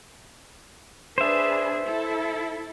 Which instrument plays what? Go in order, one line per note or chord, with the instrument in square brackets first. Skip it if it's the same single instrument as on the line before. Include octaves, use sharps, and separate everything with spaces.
[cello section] D4 G#4 B4 [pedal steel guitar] C5 E5
[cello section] E4 A4